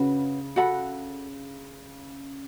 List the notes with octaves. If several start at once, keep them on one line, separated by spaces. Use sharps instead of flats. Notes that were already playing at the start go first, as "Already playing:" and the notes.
Already playing: C#3 C#4 F#4 B4
F#4 A4 F#5 B5